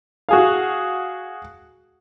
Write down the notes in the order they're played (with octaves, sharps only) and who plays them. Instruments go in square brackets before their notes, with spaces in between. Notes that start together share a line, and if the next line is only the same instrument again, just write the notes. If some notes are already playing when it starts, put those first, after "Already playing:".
[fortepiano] F#4 G#4 F5